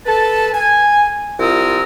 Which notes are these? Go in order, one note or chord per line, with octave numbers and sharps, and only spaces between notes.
A4 B4 A5
G#5
C2 F4 A#4 D#6 E6